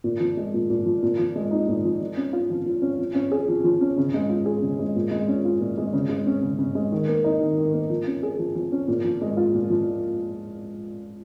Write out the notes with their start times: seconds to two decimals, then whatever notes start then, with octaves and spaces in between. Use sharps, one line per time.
0.04 A#2
0.20 F3
0.37 G#3
0.54 A#2
0.70 A#2
0.86 F3
1.03 A#2
1.19 F3
1.36 G#3
1.51 D#4
1.68 A#2
1.84 F3
2.01 F3
2.17 C#4
2.33 F4
2.50 F3
2.66 F3
2.82 C#4
2.99 F3
3.15 C#4
3.32 G#4
3.48 F3
3.64 F3
3.81 C#4
3.98 C#3
4.14 G#3
4.29 F4
4.46 G#4
4.62 C#3
4.79 G#3
4.96 A#2
5.11 G#3
5.28 C#4
5.45 F4
5.61 A#2
5.78 G#3
5.94 C#3
6.09 G#3
6.27 C#4
6.43 C#3
6.59 C#3
6.75 G#3
6.92 D#3
7.08 A#3
7.24 D#4
7.41 D#3
7.58 D#3
7.73 A#3
7.90 F3
8.07 C#4
8.23 G#4
8.39 F3
8.56 F3
8.72 C#4
8.88 A#2
9.04 F3
9.21 G#3
9.37 F4
9.54 A#2
9.70 F3